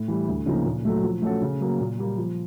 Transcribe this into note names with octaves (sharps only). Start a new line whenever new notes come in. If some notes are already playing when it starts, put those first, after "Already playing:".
Already playing: A2
E3 G3
D2
C#3 F3 A#3 D#4
A#2
F#3 A3
F3
A3 C#4 F#4 A4
C#3
F#3 A#3
A#2
G3 A#3
F3